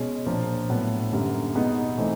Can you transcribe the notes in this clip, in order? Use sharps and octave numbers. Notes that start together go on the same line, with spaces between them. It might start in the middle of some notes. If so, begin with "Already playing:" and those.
Already playing: B2 G#3 C#4
A#2 F3 A#3 D4
A2 F#3 B3 D4
F#2 D3 G3 A#3
B2 G#3 B3 D#4
E3 A3 C4 D#4